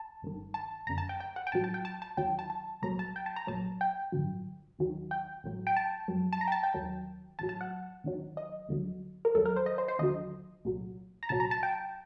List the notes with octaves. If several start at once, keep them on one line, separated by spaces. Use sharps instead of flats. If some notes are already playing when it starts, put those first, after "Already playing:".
Already playing: A5
G1 G2 D#3
A5
G1 F#2 D3 A#5
A5
G5
G5
F#5
G5
A1 A2 F#3 A5
A5
G5
A5
A5
D#2 D#3 F#3 G5
A5
A5
C2 A#2 F#3 A#5
A5
G5
A5
A#5
A#1 A#2 F#3 A5
G5
A1 G2 D3 F#3
D#2 D#3 F#3
G5
A1 A2 F#3
G5
A5
F#2 F#3
A5
A#5
G5
A5
G5
D#2 D#3 F#3
A1 A2 F#3 A5
A5
F#5
D#2 D#3 F#3
D#5
D2 D3 F#3
A#4
D#2 D#3 F#3 A4
A#4
C5
D#5
C5
C5
D#2 D3 F#3 D#5
C2 A#2 F#3
A#5
C2 A#2 F#3 A5
A#5
A5
G5